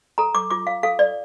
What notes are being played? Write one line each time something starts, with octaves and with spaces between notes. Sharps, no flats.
A4 A#5
D6
F4 D6
F5
A4 F5
D5